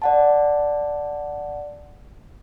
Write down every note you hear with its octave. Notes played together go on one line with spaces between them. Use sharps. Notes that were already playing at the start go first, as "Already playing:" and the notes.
D5 F#5 A5